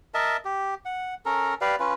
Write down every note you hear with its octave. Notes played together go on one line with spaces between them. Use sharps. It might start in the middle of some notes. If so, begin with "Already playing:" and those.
A#4 D#5 E5 A5
G4
F#5
C#4 A4 A#4 A#5
G4 B4 D5 F5
C#4 F4 B4